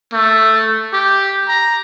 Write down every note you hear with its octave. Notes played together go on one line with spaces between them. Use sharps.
A3
G4
A#5